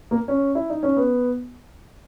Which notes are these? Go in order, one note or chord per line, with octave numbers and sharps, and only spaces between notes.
A#3
C#4
E4
D#4
C#4
B3